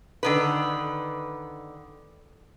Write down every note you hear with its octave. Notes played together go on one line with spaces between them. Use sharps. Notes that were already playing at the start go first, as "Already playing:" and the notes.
D3 D#3 B4